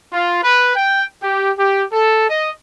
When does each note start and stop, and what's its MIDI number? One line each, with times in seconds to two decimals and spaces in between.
0.12 0.41 65
0.42 0.71 71
0.76 1.03 79
1.20 1.51 67
1.57 1.82 67
1.91 2.24 69
2.28 2.50 75